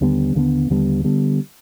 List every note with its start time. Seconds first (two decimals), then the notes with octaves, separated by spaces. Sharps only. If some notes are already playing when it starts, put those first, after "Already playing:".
0.01 D#2 D3 G3 B3
0.35 D#2 D3 G3 B3
0.70 D#2 D3 G3 B3
1.04 D3 G3 B3